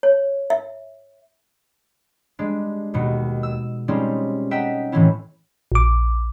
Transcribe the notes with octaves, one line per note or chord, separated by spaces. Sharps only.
C#5
E5
G3 G#3 D4
D#2 B2 C#7
E6
G3 G#3 C4 C#4 D#4 F4
D#5 E5 F#5 G5 A#5 B6
A2 D#3 E3 C4 C#4 E4
A#1 D6